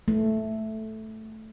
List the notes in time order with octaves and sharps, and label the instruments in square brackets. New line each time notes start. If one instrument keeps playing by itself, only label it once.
[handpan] A3